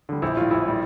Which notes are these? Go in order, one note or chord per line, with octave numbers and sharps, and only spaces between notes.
D3 G3
A#1 E4
A2 G3 F4
A#1 E4
A2 G3